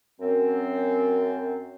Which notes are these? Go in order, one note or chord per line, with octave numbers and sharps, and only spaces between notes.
F#2 C4